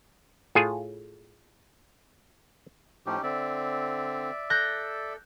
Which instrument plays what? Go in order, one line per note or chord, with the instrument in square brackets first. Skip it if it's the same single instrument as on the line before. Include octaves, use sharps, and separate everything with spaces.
[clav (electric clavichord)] A2 F4 G#4
[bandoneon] A2 F3 [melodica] C#4 D#4 G4
[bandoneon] D3 C4 [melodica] D5 E5
[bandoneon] A4 [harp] F#6 G6 A#6